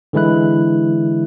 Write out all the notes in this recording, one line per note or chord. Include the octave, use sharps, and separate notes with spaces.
D3 E3 G#3 E4 F#6